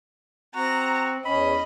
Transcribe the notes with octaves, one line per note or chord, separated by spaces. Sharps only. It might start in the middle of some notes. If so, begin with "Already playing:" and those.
C4 F#4 A#5
E2 C#4 D#5 B5